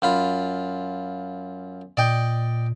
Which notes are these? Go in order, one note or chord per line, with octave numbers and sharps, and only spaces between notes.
F#2 F4 B5
A#2 D5 D#5 G5